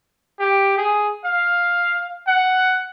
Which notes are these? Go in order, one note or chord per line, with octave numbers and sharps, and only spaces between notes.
G4
G#4
F5
F#5